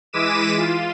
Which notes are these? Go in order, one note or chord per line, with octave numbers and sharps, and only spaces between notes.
E3 G#3 D6 B6 D#7 E7
F4